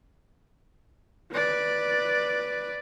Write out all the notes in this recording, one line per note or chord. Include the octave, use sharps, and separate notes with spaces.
B4 D5